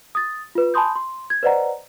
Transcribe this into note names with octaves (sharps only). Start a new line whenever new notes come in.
D#6 A6
F4 B4
G#5 A5 B5 C6 D#6 G6
C6
G#6
B4 C5 D5 D#5 F#5 A#5